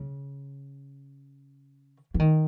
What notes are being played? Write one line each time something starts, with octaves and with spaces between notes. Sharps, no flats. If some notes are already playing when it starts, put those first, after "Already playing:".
Already playing: C#3
E3
D#3